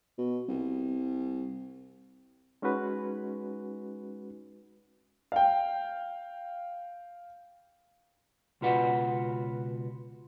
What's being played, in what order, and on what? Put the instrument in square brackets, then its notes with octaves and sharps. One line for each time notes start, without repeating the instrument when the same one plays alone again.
[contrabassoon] B2
C2
[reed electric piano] G#3 C#4 D#4 F#4 B4
[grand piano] F5 G5
[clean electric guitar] C#2 B2 F4 F#4 B4 F#5